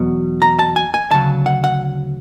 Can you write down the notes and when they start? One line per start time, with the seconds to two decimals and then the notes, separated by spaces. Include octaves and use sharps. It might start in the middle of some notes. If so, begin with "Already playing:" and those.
Already playing: E2 B2 F#3
0.42 A#5
0.59 A5
0.76 G#5
0.94 G#5
1.11 D2 C#3 F#3 A5
1.46 F#5
1.64 F#5